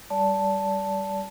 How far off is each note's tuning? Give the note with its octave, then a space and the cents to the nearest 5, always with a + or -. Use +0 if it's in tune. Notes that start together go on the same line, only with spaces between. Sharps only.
G3 +0 D5 -30 A5 +0